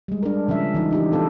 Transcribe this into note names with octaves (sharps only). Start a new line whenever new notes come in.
G3 G#3
D4 A#4
C#3 F3 C#4 E5
E3 D#4
D4 D#4 G4
C4 E4 A4 C5 F5